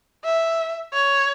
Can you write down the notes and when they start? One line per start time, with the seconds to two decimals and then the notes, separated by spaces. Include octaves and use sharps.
0.24 E5
0.93 C#5